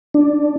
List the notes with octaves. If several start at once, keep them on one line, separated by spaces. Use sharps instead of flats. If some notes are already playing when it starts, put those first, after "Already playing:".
D4